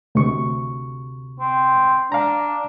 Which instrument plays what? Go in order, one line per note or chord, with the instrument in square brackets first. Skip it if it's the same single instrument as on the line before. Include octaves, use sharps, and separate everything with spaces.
[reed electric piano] D2 C3 C#6
[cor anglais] C4
[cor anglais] D4 [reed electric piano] F5 A#5